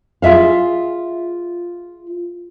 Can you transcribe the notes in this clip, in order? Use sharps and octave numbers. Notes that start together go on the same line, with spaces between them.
F4 G#4 E5 F5